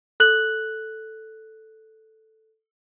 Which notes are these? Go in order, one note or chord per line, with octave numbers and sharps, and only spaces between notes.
A4 F#6 F#7